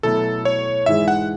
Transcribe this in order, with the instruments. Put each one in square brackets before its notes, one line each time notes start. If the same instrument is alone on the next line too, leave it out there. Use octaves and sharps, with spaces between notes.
[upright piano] B2 F#3 A3 E4 [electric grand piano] A4
[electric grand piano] C#5
[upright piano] G#2 E3 G#3 [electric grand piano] E5
[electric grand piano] F#5